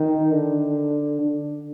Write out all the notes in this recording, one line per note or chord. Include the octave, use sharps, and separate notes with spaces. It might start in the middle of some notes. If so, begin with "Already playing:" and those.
Already playing: D#3
D3
D3